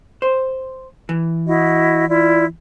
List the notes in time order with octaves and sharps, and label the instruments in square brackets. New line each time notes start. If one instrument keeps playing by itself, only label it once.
[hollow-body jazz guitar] C5
E3
[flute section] E4 F#4 D#5
E4 F4 D5